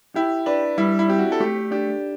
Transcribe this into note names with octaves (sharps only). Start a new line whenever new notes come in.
E4 G4
D4 B4
G3 E4
E4
C4 G4
F#4
A4
A3 G4
D4 G4